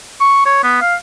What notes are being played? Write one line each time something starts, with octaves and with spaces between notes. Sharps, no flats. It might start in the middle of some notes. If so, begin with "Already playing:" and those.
C#6
C#5
B3
F5